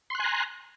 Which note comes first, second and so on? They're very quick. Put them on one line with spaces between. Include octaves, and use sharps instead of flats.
C6 F#6 G#5 A#5